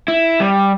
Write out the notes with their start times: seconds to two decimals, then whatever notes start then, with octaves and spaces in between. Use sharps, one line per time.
0.08 E4
0.40 G3